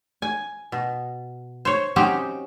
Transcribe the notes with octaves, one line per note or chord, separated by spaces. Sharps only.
G#5
B2
C5 C#5
F#3 C4 C#4 D#4 G4